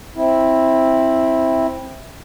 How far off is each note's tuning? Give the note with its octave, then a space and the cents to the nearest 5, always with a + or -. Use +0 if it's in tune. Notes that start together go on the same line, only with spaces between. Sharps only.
C4 +10 E4 -10